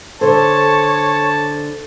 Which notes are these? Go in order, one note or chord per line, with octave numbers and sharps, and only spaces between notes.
D3 A4 C5 C#5 A5